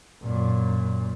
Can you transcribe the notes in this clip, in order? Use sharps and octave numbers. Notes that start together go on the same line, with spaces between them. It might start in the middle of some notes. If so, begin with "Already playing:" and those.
F#2 A#2